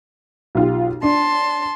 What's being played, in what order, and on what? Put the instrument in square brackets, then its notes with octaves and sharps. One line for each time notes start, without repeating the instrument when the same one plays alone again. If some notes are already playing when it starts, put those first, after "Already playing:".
[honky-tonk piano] B1 F4 G4
[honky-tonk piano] D4 [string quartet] A5 C6